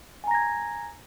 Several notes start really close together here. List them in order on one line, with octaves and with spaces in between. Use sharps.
G#5 A#5 A#6 G#6